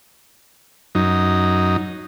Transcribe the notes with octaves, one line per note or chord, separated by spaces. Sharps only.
F#2 D#4